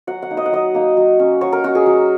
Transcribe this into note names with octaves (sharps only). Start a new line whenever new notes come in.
F#3 F#5
F#5
A#3 D#4
D#5
F#5
F#3 D#5
A#3 D#4
F#3
C#4
F#3 C#5
A#4
C#4 F#4
G#4
F#3